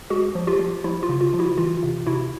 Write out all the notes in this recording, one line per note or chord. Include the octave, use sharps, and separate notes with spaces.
G#3 F#4 G#4
F3
F4 G4
F3
F3 E4
F4
C#3
F4
F3
E4 F#4
E3 F4
C3
C3 E4 F#4